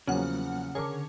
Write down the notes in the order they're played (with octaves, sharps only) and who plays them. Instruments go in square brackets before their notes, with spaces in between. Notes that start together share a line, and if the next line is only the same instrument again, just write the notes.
[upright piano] E2 F3 [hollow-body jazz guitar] C#3 [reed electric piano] F#3 A#3 C#4 [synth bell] F#5 F6
[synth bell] D3 C#5 [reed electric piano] G#4 [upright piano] A#4